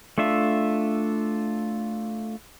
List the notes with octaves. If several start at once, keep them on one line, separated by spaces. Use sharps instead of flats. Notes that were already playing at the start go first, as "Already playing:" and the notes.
A3 D4 F4 E5